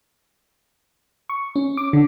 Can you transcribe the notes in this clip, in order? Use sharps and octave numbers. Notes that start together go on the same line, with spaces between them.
C#6
C#4
D6
D3